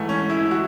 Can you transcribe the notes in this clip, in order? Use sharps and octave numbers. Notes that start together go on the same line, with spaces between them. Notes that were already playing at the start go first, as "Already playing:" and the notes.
Already playing: G#2 E3 A3
C#4
E4
F#4